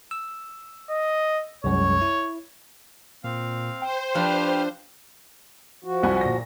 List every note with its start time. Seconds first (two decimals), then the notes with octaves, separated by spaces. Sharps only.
0.11 E6
0.90 D#5
1.64 C2 F#2 G#3 C#5
2.02 E4
3.24 A#2 C4 F5
3.82 C5 G5
4.15 F3 D4 G4 B4 F6
5.84 F3 F#4
6.03 C2 F#5 G#5
6.21 A#2 A#6